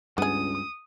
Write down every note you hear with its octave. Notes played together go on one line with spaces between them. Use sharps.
C#2 G2 B3 G#4 D#6